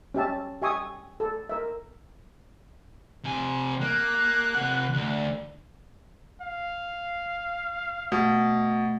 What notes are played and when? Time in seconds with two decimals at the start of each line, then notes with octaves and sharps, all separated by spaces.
0.14 C#4 G4 E5 A5
0.62 G4 E5 G#5 C#6 D#6
1.20 A4
1.49 A#4 E5
3.24 C3 G#5
3.81 A#3 F#6
4.55 C3 F#5
4.94 D2
6.42 F5
8.12 B2 A3